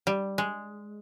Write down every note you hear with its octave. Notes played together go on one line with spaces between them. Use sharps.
G3
G#3